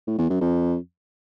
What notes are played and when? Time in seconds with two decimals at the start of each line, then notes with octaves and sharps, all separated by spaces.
0.07 A2
0.18 E2
0.30 F#2
0.41 F2